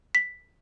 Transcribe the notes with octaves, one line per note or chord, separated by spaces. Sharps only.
B6